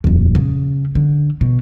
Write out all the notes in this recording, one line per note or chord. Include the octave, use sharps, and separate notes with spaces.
D#1 F2
C#3
D3
B2